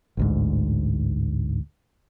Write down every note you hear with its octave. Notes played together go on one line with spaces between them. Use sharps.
A1 D2 G#2